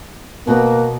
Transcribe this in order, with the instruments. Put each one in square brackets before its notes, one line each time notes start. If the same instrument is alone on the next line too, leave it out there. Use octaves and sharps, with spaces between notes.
[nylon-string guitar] B2 F#4 B4 [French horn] A#3